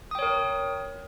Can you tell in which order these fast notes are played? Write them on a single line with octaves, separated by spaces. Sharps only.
D#6 G5 C#5 A#4